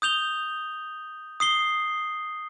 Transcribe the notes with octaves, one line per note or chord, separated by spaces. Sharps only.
D#6 G6 F7 G7
D#6 C7 G7